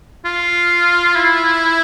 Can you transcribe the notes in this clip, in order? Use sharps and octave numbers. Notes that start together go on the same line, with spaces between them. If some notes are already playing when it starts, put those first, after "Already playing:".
F4
E4